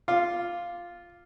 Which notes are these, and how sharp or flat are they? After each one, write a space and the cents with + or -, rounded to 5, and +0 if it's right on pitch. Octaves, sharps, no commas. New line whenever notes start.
F4 +0 F5 +0 D6 +0